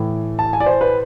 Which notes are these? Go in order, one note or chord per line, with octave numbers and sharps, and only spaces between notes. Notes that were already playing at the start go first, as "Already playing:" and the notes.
Already playing: A2 E3
A5
G#5
D5
C5
B4